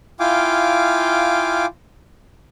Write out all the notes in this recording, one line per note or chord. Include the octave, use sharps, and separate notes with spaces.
E4 F4 F5 G5 G#5 D6